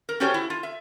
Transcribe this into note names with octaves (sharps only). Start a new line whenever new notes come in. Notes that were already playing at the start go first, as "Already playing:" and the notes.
A#4
C#4 F#4 G4 A4 C5 C#5
E4
F4
E5